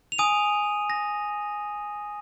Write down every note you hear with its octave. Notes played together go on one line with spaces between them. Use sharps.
F7
G#5 D#6 D#7
A#6